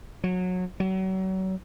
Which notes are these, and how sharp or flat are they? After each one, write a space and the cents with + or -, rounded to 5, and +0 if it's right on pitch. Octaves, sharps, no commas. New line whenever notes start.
F#3 -20
F#3 +35